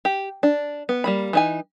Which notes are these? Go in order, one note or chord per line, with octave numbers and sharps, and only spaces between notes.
G4
D4
B3
G3 A#3 B5
E3 D#4 G#5